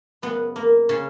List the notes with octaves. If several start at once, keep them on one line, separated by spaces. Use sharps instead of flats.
F#2 C#3 B3
A#3
C#3 C#4